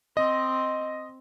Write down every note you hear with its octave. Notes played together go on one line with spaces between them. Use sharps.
C4 D#5